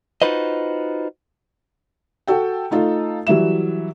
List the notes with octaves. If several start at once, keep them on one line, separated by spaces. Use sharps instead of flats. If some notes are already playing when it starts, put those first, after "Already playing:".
D#4 F4 F#4 B4 C5 D#5
F#4 A4 G5
A3 D#4 F4 A4
E3 F#3 G3 E5 E7